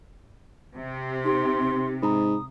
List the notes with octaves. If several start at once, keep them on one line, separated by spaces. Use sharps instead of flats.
C3
D#4 G4 C6
G#2 A#5 B5 D#6